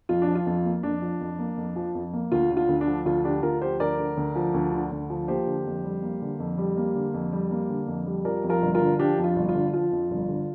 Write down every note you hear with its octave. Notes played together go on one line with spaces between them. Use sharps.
F2 F4
D4
F3
F4
F2
A#3
F2 D4
F3
F2
A#3
F2
F3
F2
A#3
D2 F4
D3
F4
D2
D4
F3
D2 F4
D3 D4 G4
D2 F4 A#4
F3 G4 C5
D2 A#4 D5
D3
D2
F3
D2
D3
D2
F3
A#3 G4 C5
D3
F2
G3
A#3
D3
F2
G3
A#3
D3
F2
G3
A#3
D3
F2
G3
F3 A#4 D5
F2
F4 A#4
G1
F4 A#4
D3
F3 D4 G4
F2
F4
G1
F4
D3
F3 F4
F2
G1
D3